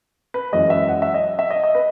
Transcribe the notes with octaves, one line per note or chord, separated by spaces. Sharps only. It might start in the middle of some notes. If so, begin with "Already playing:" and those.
B4
F#2 E3 G#3 D#5
E5
F#5
E5
D#5
E5
D#5
D#5
B4